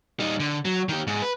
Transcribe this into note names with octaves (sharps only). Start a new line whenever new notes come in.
G3 D#4
D3
F#3
D#3 G4
G#2
B4